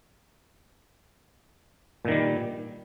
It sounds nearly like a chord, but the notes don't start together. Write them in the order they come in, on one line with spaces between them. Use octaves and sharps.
A#2 D#3 G3